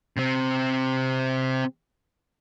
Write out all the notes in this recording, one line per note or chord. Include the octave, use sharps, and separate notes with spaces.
C3 C4